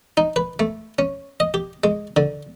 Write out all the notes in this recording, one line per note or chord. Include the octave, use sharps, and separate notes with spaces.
D#4
B4
A3
C#4
D#5
G4
G#3
D3